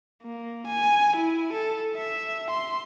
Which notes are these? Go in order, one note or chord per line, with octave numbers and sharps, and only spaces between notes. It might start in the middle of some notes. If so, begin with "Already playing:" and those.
A#3
G#5
E4
A4
E5
C6